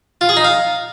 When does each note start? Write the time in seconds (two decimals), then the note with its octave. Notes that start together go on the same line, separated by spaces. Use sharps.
0.21 F4
0.29 G#4
0.37 D#4
0.44 F5